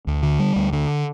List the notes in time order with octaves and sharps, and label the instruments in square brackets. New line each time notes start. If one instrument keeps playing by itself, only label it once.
[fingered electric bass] D2
D3
G3
D2
D3